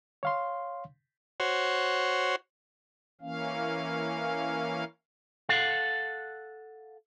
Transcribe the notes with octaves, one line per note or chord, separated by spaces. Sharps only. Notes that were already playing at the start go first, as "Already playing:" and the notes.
C#5 F5 C6
F#4 C5 C#5
E3 A#3 C#4 F5
A4 F5 F#5